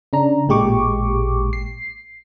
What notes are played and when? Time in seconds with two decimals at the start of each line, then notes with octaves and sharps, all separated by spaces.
0.13 C#3 D4 A#5
0.48 A1 A#2 G#3 G4 C#6 D6
1.53 C7